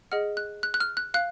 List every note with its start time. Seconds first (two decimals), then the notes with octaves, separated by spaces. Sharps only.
0.12 G#4 D#5 F#5 F6
0.37 F#6
0.63 F#6
0.74 F#6
0.80 F6
0.97 F#6
1.14 F5 F#6